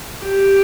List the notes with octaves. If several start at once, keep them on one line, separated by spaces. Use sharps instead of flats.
G4